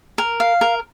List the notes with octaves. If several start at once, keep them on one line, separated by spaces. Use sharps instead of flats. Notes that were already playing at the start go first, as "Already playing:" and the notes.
A#4
F5
A#4